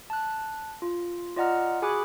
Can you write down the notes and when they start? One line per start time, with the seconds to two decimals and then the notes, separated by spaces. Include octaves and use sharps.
0.10 A5 F#6
0.82 F4
1.36 F4 D5 D#5 F#5 A#5 F6
1.82 F#4 G#4 G#5 B5 D6 F#6